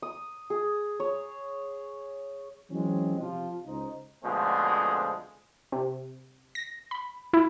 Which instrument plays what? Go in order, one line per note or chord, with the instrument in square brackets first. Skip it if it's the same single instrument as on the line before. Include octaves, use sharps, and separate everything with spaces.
[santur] D#6
G#4
C#5
[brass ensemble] E3 F#3 G#3 C4 C#4
C3 F3 F4
C#2 D#4 C5
[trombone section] B2 D3 F3 G#3 A3 C4
[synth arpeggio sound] C3
A#6
B5
E4